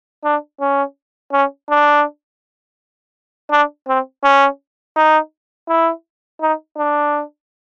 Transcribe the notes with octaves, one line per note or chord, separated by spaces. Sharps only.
D4
C#4
C#4
D4
D4
C4
C#4
D#4
E4
D#4
D4